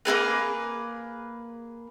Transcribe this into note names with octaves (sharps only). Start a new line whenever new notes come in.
A#3 C4 G#4 B4